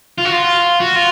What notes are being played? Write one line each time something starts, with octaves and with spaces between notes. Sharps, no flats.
F4
F#4
F4
F#4
F4